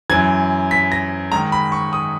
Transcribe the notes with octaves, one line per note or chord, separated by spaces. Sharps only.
F#2 E3 G#6
B6
A#6
G#2 D#3 A#5
B5
C#6
D#6